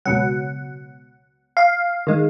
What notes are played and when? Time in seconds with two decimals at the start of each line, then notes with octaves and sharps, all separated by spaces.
0.05 C#2 B2 F#3 F#5
1.57 F5
2.07 D#3 G#3